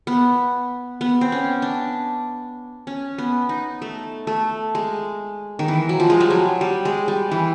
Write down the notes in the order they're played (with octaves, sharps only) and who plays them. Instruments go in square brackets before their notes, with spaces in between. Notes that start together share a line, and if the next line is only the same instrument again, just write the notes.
[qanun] B3
B3
C4
C#4
D4
C#4
B3
D#4
A3
A3
G#3
D#3
E3
F#3
F3
G#3
G3
F#3
G3
G#3
G3
E3